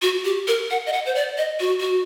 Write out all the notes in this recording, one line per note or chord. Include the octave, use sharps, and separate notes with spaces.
F#4
G4
A#4
F#5
D#5
F#5
C5
D5
D#5
F#4
F#4